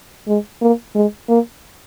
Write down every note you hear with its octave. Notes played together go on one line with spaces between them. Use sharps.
G#3
A#3
G#3
A#3